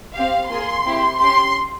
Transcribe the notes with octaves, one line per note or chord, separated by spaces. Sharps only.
C4 G4 F5
A#3 F4 G#4 C6
C4 E4 G4
C#4 G4 C6